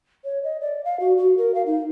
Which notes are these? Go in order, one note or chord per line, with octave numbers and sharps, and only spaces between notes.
C#5
D#5
D5
F5
F#4
F#4
A#4
F5
D#4